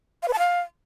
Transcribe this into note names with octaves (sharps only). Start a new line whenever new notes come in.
F5
B4
A5
F5